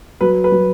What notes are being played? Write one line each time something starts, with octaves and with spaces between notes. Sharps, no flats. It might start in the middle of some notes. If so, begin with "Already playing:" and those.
F#3 B4
B4
F#3